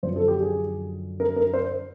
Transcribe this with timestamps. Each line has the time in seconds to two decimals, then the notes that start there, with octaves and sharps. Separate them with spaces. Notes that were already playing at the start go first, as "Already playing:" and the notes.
0.03 F#2 D3 F3 C5
0.16 A4
0.28 G4
0.40 G#4
1.20 A#4
1.36 A#4
1.54 C5